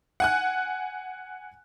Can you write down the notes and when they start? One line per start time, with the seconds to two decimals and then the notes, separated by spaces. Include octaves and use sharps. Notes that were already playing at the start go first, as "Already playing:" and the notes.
0.20 F#5 G#5 F#6